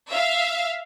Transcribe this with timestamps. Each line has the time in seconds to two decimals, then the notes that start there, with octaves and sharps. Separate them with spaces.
0.12 E5 F5